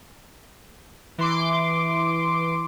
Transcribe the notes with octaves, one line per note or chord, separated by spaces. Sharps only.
E3 C6 D6